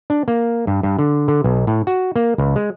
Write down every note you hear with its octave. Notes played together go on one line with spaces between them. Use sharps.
D4
A#3
G2
G2
D3
D3
B1
A2
F#4
A#3
C#2
G#3